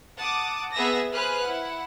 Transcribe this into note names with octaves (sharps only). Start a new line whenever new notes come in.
F#5 A5 D6 D#6
B3 G#4 E5 E6 A#6
G#4 B4 C5 F6 F#6
E4 F#5